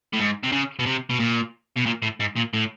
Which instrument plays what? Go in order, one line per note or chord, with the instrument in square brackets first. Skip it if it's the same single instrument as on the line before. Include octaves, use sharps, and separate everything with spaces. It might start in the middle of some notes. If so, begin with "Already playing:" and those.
[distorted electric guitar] A2
G#2
C3
C#3
B2
C3
B2
A#2
B2
A#2
A2
G#2
A#2
A2